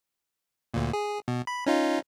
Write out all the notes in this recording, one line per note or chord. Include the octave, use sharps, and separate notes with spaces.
D2 A#2
G#4
B2
B5
C#4 D#4 F4